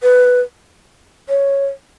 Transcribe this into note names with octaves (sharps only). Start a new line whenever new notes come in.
B4
C#5